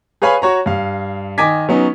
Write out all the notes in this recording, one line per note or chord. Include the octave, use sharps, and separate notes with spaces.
G#4 B4 C#5 F5 G#5 B5
F#4 C#5 A#5
G2 F5
D#3 D#5 G#5 D6 G#6 B6
F#3 B3 C#4 D#4